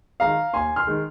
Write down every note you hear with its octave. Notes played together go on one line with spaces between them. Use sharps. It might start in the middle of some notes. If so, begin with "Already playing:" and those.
D#3 G#3 F5 A#5
D#2 G#5 C6
C6 F6
D#3 G#3